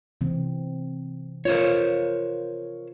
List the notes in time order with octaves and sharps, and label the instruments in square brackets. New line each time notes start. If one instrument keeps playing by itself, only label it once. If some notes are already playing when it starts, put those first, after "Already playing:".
[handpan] C3 E3 C4
[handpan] F4 [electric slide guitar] A#4 C5 C#5